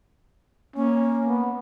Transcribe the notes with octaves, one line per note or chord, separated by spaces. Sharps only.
A#3 C#4
B3